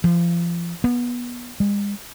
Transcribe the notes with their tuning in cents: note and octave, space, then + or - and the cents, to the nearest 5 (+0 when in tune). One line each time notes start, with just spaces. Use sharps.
F3 -30
B3 -20
G#3 -40